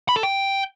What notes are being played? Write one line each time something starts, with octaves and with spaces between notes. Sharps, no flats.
B5
A4
G5